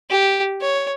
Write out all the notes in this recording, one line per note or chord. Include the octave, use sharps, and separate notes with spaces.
G4
C#5